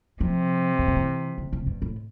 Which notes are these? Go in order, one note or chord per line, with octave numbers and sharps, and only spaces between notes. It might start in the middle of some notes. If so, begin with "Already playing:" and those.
C3 F3
E3
D3
E3
D3
C3
G2
A2